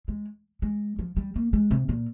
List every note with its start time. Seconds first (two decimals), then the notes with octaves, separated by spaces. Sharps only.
0.08 G#3
0.62 G#3
0.99 F3
1.17 G3
1.36 A#3
1.53 G#3
1.71 C3
1.89 A#2